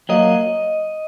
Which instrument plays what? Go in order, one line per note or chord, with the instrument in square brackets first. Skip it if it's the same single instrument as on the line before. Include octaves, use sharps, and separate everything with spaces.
[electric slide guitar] F#3 A#3 [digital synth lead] D#5